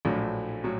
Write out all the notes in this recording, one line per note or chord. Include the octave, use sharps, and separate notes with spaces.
A#1 A2 F#3 A3 D4
A2 F#3